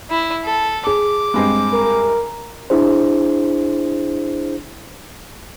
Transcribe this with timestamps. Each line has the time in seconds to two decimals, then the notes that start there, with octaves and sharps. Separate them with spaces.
0.11 E4
0.44 A4
0.87 G#4 D6
1.34 G2 G#3 C4
1.73 A#4
2.70 D4 E4 G#4 C5